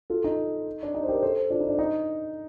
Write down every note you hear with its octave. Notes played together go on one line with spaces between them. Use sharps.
F4 A4
D#4
D4
D#4
C5
G4 A#4
A4 C5
D4 F4
D#4
D4
D#4